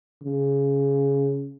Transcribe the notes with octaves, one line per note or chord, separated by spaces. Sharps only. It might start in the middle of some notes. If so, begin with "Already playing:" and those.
C#3